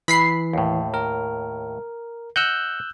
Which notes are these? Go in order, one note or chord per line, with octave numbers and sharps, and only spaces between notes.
E3 B5 B6 C7
D#2 A2
A#4
D#5 F#5 E6 F#6 G6